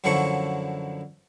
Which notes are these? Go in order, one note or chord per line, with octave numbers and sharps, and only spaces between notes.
F#2 D3 F3 F#3 E4 C#6